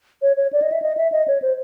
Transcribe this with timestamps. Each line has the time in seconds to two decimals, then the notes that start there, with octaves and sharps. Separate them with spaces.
0.22 C#5
0.37 C#5
0.53 D5
0.62 D#5
0.72 E5
0.82 D#5
0.97 E5
1.12 D#5
1.28 C#5
1.42 C5